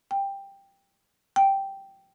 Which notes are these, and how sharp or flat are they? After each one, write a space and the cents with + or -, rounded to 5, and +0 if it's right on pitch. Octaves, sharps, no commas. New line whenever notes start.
G5 +10
G5 -5